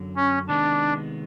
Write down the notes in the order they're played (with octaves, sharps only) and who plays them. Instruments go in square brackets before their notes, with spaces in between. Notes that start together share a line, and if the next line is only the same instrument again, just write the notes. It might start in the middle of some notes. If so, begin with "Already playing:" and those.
Already playing: [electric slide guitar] F#2 D3 F#3
[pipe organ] C#4
[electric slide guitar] C3 D#3 G#3 B3 [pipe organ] D4